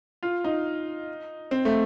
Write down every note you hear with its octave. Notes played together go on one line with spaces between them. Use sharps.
F4
D#4
C4
A3